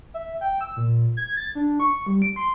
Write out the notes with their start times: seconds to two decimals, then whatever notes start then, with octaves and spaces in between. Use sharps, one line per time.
0.14 E5
0.41 G5
0.61 E6
0.77 A#2
1.17 G#6
1.37 A6
1.55 D4
1.80 C#6
2.06 G3
2.22 D7
2.36 C6